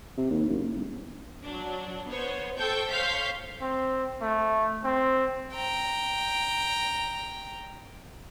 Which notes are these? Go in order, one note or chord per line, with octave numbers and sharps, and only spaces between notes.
C3
D#2
F#1
G1
F#3 D4
B3 C5 C#5
A4 C5 G5 A5 C#6 G6
C5 C#5 F5 G6 B6
C4
A3
C4
G5 A#5